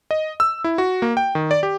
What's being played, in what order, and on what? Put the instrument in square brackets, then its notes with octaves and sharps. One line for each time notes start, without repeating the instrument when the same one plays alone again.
[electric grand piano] D#5
E6
E4
F#4
A#3
G5
D#3
D5
G4